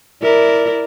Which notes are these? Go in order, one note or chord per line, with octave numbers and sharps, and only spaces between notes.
E4 A#4 D5